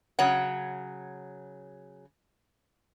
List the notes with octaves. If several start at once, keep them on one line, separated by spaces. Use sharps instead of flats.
C#3 F#3 C#5 F#5